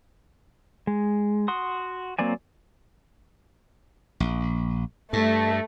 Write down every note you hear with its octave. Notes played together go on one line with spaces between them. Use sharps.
G#3
F#4 F#5 C6 D#6
F#3 A#3 C4 D5 G#5
A#1
G2 A3